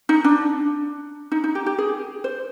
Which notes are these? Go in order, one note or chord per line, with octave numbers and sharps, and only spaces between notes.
D#4
D4
D#4
D#4
G4
G4
G#4
C5